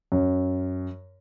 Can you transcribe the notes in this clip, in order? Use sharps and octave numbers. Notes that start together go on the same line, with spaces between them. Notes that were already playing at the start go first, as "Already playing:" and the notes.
F#2